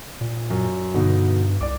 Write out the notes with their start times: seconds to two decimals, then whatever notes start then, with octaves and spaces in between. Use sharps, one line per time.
0.21 A#2
0.50 F#2
0.94 G2 B2 D3 D#4
1.61 C2 D5 D6